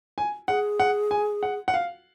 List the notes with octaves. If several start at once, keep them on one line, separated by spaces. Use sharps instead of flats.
G#5
G#4 F#5
F#5
G#5
F#5
F#5
F5